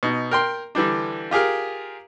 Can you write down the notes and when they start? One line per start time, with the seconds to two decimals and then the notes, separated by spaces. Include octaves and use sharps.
0.03 B2 D#4
0.31 A#4 G5 C6
0.75 D3 E3 G3 D4
1.31 F4 G4 G#4 A#4